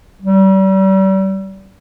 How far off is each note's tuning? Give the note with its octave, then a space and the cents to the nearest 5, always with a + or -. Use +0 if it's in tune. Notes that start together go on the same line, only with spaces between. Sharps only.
G3 -35